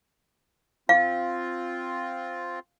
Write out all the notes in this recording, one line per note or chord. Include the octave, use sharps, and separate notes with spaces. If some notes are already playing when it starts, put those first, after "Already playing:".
C4 F4 F5